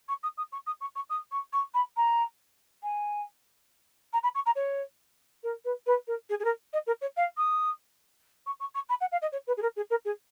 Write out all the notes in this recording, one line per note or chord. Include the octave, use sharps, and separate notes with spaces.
C#6
D#6
D#6
C#6
D#6
C#6
C#6
D#6
C#6
C#6
B5
A#5
G#5
A#5
B5
C#6
A#5
C#5
A#4
B4
B4
A#4
G#4
G#4
A#4
D#5
A#4
C#5
F5
D#6
C#6
C#6
C#6
B5
F#5
F5
D#5
C#5
B4
G#4
A#4
G#4
A#4
G#4